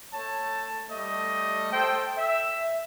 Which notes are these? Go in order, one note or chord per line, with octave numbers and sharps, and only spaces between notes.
A3 C#5 A5
G3 A3 D#5
A4 C5 G5
E5